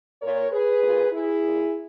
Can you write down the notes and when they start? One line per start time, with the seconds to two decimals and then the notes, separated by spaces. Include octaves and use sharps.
0.22 A#2 A#4 C#5
0.52 G#4 B4
0.82 A#2
1.12 E4 G#4
1.41 A#2